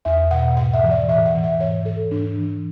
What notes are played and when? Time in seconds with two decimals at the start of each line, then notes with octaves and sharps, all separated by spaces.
0.05 E2 E5
0.31 B2 F#5
0.57 G#2 F#5
0.73 E5
0.83 E3
0.91 D5
1.09 A2 E5
1.26 F#5
1.35 E3
1.44 E5
1.60 G#2 C#5
1.86 E3 A4
2.11 G#2 D4
2.38 E3